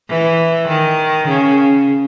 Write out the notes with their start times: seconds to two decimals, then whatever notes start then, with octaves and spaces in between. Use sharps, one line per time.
0.09 E3
0.68 D#3
1.28 C#3